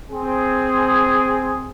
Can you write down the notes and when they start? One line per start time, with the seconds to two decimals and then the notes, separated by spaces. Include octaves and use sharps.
0.10 C4 G#4